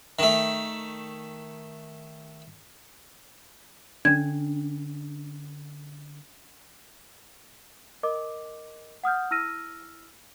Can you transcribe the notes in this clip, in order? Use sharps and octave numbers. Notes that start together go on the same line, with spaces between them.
D#3 A3
D3 C#4 D4 G#6
A#4 D#5 D6
F#5 D#6 F6 G6
E4 E6 F6 A#6 D#7